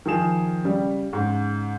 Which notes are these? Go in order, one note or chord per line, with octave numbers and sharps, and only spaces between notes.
D#3 F3 G#4 E7
C#3 G3
G#2 C#3